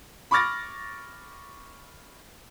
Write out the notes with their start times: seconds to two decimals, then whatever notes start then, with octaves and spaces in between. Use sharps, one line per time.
0.31 B5 C#6 D6 F6 A6 A#6